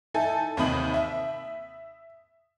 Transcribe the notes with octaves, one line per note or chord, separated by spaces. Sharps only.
D#4 E4 A4 G#5
D#2 C3 D#4 B5 D#6 F#7
E5